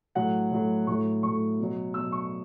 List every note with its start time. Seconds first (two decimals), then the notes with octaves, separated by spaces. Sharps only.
0.15 A2 F#3 F#5
0.51 A2 F#3
0.87 A2 F#3 C#6
1.23 A2 F#3 C#6
1.59 B2 F#3
1.94 B2 F#3 E6
2.12 C#6